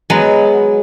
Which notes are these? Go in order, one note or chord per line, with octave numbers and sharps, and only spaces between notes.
F#3 G#3 B3